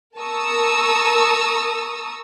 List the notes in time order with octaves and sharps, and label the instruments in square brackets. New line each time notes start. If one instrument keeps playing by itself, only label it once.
[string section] A#4 A5 A#5 C#6 D#6 E6